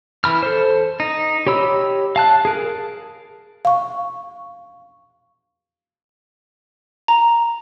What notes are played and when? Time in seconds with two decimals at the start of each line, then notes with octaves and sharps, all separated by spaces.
0.24 E3 B5 F6
0.43 A4 C5
1.00 D#4
1.47 G4 C#5 B5 E6
2.16 F5 A5 F#6
2.45 G#4 A#4
3.65 F5 C#6
7.08 A#5